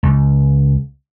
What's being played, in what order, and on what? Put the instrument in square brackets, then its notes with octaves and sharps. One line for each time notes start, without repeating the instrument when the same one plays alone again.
[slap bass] C#2